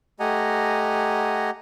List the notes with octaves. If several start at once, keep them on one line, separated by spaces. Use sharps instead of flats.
A3 G4 D#5 F#5 G#5 A#5